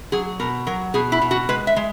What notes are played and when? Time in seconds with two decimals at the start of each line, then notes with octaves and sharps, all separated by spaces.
0.12 F#3 G#4
0.40 B2 A#4
0.67 F#3 A#4
0.94 B2 G#4
1.12 E4
1.22 B2
1.31 F#4
1.49 G#3 B4
1.67 E5
1.76 G#3